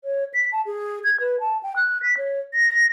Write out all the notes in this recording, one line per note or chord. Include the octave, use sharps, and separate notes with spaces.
C#5
B6
A5
G#4
G#6
B4
A5
G5
F#6
B6
C#5
A#6